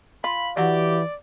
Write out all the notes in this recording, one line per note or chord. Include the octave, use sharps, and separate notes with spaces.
F4 B5
E3 F#3 F#4 G4 D5